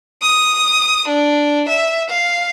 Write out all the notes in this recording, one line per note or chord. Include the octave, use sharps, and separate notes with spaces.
D#6
D4
E5
F5